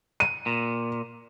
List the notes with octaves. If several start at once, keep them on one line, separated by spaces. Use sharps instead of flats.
D#7
A#2